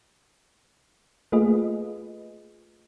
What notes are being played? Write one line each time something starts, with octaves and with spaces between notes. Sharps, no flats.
A3 A#3 F4 G#4 B4 D#5